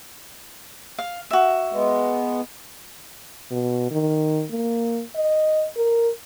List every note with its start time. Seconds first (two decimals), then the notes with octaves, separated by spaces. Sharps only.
0.99 F5
1.31 F#4 E5
1.73 G#3 B3
3.51 B2
3.91 D#3
4.51 A#3
5.15 D#5
5.76 A#4